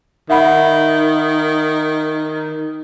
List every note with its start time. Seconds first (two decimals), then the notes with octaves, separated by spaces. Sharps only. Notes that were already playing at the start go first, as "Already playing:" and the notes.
0.30 D#3 E5 F#5 B5